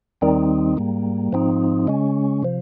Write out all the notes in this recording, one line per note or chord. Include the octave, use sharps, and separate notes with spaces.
D#2 D#3 G3 C4 D#4
G#2 G3 A#3
G#2 F3 C4 D#4
C#3 G#3 C#4
C3 F3